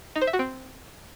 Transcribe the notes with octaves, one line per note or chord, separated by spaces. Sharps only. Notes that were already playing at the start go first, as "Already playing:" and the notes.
D#4
C5
E5
F#4
C4